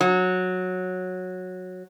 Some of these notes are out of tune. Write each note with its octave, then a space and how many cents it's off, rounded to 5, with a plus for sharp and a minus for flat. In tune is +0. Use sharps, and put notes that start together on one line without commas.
F#3 -10